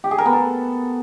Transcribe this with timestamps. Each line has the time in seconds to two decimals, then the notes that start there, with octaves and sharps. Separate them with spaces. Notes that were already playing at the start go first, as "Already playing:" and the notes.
0.04 G4
0.11 G#4
0.18 A#4
0.26 B3
0.33 A4